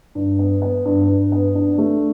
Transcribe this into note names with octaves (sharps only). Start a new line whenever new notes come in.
G2
B3
B3
G2
G2
B3
D4
A3